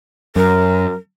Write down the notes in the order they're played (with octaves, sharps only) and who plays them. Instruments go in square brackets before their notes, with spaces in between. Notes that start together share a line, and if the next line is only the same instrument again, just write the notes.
[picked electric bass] F#2 [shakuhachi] A#4